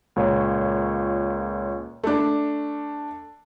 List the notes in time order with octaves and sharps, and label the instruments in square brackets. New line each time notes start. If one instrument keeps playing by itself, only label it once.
[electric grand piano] C#2 A#2 C#5
[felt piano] A3 D4